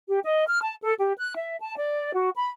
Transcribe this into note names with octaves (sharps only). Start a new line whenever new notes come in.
G4
D#5
F6
A5
A4
G4
F#6
E5
A5
D5
F#4
B5